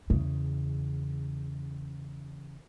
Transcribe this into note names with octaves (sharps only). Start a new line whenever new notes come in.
E2 C#3